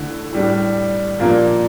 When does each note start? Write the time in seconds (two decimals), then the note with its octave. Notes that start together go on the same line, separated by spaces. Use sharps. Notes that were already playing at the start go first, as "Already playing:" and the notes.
Already playing: D3 A3 E4
0.33 A2 G3 D4
1.20 A#2 F3 A#3 D4